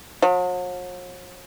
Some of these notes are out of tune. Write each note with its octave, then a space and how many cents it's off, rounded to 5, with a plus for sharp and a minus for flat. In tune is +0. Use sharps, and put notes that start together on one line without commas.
F#3 -45